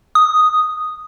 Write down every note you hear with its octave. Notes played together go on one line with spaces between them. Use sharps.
D#6